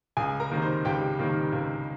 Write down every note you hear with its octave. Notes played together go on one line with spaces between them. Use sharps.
C#2 G#4 G#5
A#4 A#5
C3 D#3 A#3
C5 C6
C#2 G4 G5
C3 D#3 A#3
C#2